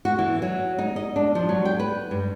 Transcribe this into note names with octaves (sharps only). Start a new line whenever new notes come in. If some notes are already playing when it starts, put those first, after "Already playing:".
F#4
E3
F#3
D#4
D#5
D4
F3
F#3
G5
B4
G2